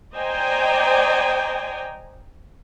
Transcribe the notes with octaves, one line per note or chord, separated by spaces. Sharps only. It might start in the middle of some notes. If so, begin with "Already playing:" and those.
C5 D5 D#5 G5 G#5 A#5